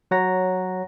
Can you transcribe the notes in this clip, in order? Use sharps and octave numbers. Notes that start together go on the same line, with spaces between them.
F#3 C#5 F#5 A#5 A#6